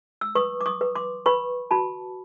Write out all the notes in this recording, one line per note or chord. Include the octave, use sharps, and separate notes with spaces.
E6
B4 C#6 D#6
D6
C#6 D#6
B4
C6 D6
B4 B5 C#6
F#4 A5 B5